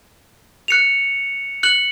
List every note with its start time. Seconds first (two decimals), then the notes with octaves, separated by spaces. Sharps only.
0.68 F#6 C#7 F7
1.63 F#6 C#7 F#7